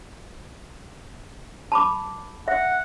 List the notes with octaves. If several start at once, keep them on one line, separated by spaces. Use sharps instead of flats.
A5 B5 D6
E5 F#5